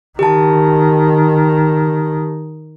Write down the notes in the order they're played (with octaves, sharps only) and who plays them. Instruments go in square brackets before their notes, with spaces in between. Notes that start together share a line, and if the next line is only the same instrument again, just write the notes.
[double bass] D#3 [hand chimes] G4 A5